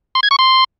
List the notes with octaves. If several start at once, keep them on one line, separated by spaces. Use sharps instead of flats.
C6
G#6
C#6
C6